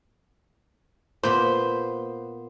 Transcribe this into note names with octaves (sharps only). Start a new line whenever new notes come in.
A#2 B3 C5 B5